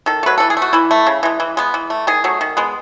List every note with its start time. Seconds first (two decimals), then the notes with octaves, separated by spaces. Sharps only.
0.06 D#3 A4
0.23 F#3 A3 B4
0.38 E3 A4
0.50 G#4
0.57 A3
0.62 F#4
0.73 E3 E4
0.91 A3
1.07 C#3
1.23 E3 G#3
1.40 E3
1.57 G#3 B3
1.74 E3
1.90 A3
2.07 D#3 G#4
2.24 F#3 A3
2.41 D#3
2.57 G#3 B3